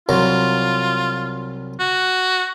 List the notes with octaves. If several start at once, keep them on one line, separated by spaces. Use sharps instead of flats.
C2 F#3 F4
F#4